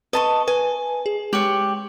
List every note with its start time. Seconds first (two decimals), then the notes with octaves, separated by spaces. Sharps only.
0.13 B4 D#5 A5 C#6
0.48 B4 G#5
1.06 G#4
1.33 G#3 G4 C#5 F#7